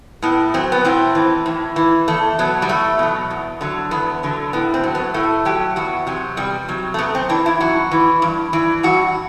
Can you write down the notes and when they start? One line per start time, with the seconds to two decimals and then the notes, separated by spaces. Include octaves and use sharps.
0.22 A2 B3
0.54 F#3 C4
0.72 B3
0.85 A2 C4
1.15 E3
1.46 A2
1.76 E3
2.08 E2 A3
2.39 B2 F#3 B3
2.62 G3
2.69 E2 A3
2.99 B2 F#3
3.30 E2
3.61 D3 F#3
3.91 E2 B3
4.23 D3 F#3
4.53 A2 B3
4.74 C4
4.83 F#3
4.95 B3
5.14 A2 A3
5.45 F#3 G4
5.76 E2 F#4
6.07 C3 F#3
6.37 E2 G3
6.68 C3 F#3
6.94 A3
6.98 F#2 B3
7.15 C4
7.29 E3 D4
7.46 E4
7.60 F#2 F#4
7.91 E3
8.22 G2
8.53 E3
8.83 G2 F#4